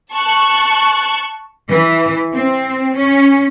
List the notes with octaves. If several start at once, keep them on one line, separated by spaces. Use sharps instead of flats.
A5 C#6 F#6
E3
C4
C#4